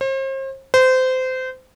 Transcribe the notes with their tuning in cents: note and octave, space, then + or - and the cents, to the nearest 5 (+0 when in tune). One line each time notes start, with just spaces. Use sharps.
C5 +40
C5 -25